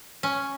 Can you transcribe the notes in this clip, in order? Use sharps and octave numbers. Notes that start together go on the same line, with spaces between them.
C#4